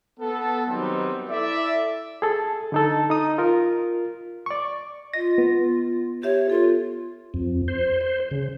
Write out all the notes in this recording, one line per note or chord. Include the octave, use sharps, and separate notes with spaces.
B3 A4
D#3 F#3 G3 B3 C4 D#4
E4 A4 D5 E5
G#4 A4
D3 D#4 A4
D#4 D#6
F4 A#4
D5 C#6
F4 D#5 A#6
B3
G4 C#5 E5
F4 A4
F2
C5
C5
C#3